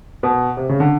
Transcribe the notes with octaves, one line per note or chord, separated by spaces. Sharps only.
B2
C3
C#3
D3